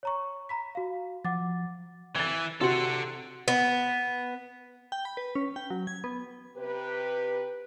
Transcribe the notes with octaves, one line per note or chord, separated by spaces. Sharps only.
C#5 A#5 C#6
A#5 B5 B6
F#4 F5
F3 F#5 D6 A6
E3 G#6 A6
C3 F#4 A4 F#5 C6
B3
G5
B5
B4
C#4
G5
F#3
G#6
B3
C3 G4 B4